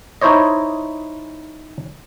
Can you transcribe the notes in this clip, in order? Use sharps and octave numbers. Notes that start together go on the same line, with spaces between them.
D#4 E4 C5 C#5 D#5